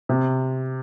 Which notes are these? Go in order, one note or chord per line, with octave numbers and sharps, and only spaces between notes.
C3